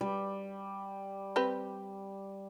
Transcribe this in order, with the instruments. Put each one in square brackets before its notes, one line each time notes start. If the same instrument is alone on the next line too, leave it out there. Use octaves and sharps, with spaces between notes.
[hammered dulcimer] G3
[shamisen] C4 G4 B4